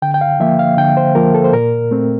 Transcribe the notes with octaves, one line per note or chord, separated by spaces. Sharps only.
D3 G5
G5
F5
F3 A#3 E5
F5
D3 G5
C5
F3 A#3 A#4
A4
C5
A#2 A#4
A3 C4